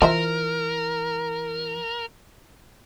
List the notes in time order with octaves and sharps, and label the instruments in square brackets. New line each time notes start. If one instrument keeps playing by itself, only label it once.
[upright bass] E3 [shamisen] F4 C5 E5 [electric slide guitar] A#4